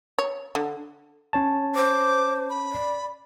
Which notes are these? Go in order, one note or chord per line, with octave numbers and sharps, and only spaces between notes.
C#5
D3
C#4 C#5 A5
C5 D6
B5
D5